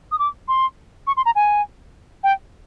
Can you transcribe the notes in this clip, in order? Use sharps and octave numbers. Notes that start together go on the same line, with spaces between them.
D#6
D6
C6
C#6
C6
A#5
G#5
G5